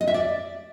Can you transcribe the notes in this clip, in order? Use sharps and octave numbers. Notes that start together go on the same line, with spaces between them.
D#5
E5
D5